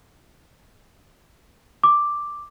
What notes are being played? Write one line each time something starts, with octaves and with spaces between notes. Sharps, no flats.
D6